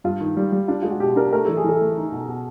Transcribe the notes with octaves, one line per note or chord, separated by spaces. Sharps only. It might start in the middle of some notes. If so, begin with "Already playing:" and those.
G2 F4
D#3
G3
G3
D4 F4
G#3 F4
F#4
B2 G4
D4 A#4
A3 A#4
E3 A4
G#4
E3 A4
A3
D#4
B2
B2